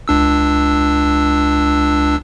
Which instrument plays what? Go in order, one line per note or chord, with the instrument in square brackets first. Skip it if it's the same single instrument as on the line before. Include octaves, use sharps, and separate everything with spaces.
[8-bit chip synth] C#2 D4 E6